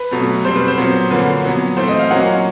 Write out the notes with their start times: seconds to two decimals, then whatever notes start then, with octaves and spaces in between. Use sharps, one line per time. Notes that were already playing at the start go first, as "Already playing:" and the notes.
Already playing: B4
0.11 B2 F#3 A3
0.45 B2 G3 C4 C5
0.56 B4
0.68 C5
0.77 A#2 F#3 B3
1.10 D3 F3 A#3 C#4 B4
1.45 A#2 F#3 B3
1.77 E3 A3 C4 C5
1.88 D#5
1.99 F5
2.11 A#2 F#3 A#3 C#4 F#5